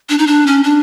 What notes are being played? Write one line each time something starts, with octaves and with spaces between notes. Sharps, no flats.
D4
D#4
D4
C#4
D4